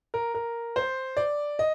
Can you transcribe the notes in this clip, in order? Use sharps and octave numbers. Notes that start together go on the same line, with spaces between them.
A#4
A#4
C5
D5
D#5